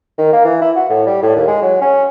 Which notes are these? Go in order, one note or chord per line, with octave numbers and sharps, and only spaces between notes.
D#3
A#3
E3
E4
F#4
A2
G3
A2
D#2
G#3
F#3
C#4